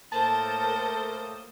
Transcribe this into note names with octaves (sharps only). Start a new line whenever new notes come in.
A2 A#3 A4 A#4 C5 A5 D#6